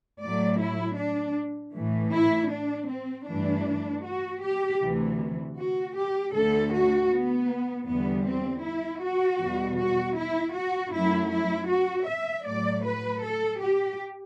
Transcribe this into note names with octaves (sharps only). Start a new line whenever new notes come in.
A2 F#3 A3 D5
E4
D4
A2 E3 A3
E4
D4
C4
G2 E3 A3 D4
F#4
G4
D2 C3 E3
F#4
G4
D2 D3 A3 A4
F#4
B3
E2 D3 G3 B3
C4
E4
F#4
E2 B2 G3
F#4
E4
F#4
F#2 F#3 A3 E4
E4
F#4
E5
A2 F#3 A3 D5
B4
A4
G4